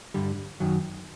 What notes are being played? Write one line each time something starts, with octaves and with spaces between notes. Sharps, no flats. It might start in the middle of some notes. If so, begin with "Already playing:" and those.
G2 D3 G3
F#2 D#3 F#3